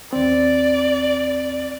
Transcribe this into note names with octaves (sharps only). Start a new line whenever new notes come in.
D#2 C4 D5